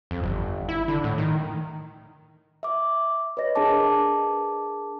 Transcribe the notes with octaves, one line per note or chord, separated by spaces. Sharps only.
F2
G1
E4
D3
A2
D#3
E5 D6
B4 C#5 D#5 A#6
D4 G#4 A#4 G#5 A5 D6